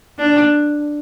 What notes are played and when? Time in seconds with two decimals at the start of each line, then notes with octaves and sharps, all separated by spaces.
0.19 D4